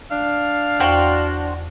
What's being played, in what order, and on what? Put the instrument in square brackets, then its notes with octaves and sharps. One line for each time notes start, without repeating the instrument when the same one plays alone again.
[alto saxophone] D4 [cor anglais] F5
[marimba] E2 D5 [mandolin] F#4 C5 G5